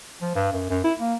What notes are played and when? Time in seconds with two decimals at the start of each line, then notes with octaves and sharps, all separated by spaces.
0.22 F3
0.35 G2
0.53 F#2
0.70 F#2
0.84 E4
0.99 A#3